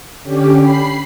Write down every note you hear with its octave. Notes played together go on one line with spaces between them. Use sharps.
D3 C#4 G4
B5 C7